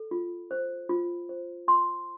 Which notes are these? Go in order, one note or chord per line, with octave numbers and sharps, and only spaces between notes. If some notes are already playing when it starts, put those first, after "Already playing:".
Already playing: A4
F4
C5
F4
C5
F4 C6